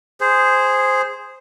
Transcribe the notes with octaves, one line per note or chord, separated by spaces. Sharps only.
G#4 C5